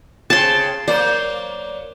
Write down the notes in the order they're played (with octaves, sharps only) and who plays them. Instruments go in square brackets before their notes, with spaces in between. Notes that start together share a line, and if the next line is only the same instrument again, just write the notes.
[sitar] C#3 C4 [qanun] A5 C6
[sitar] F#3 A#3 D5 [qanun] C5